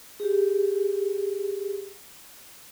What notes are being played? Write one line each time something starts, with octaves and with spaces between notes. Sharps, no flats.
G4 G#4